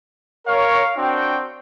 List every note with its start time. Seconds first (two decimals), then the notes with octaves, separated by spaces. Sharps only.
0.47 A#4 C#5 F5
0.97 C4 D4 F#4 G5